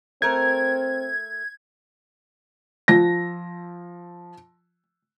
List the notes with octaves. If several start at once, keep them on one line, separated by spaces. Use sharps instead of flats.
A3 C4 A#4 G#6
F3 A#6